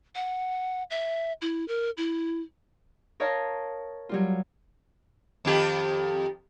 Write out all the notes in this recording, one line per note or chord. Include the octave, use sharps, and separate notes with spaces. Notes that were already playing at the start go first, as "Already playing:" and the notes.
F#5
E5
E4
A#4
E4
A#4 C#5 D#5 F5 A5 A#5
F#3 G3 F4
F2 D#3 G4